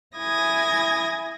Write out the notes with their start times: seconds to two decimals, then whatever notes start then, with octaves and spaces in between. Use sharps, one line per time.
0.16 E4 G#5 D#6 G#6 A#6